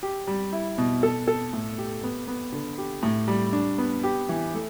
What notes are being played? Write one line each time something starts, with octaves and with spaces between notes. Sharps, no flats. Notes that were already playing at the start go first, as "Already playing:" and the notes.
G4
G3
E4
B2
A4
A4
A2
G4
B3
B3
D3
G4
A2
G3
D4
B3
G4
E3
A3